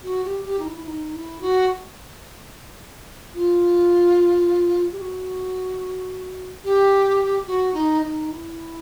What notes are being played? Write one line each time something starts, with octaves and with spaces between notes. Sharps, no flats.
F#4
G4
G4
D#4
E4
E4
D#4
E4
F#4
F4
G4
F#4
G4
F#4
D#4
D#4
E4